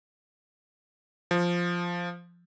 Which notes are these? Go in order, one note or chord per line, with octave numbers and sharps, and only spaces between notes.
F3